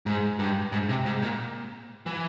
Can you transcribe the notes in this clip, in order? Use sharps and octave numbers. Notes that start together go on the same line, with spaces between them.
G#2
G2
G#2
C3
G#2
A#2
E3